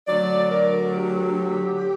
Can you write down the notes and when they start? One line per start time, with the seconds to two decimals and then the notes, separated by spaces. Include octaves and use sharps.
0.08 D2 D3 F#3 D5
0.52 A#4
0.96 G4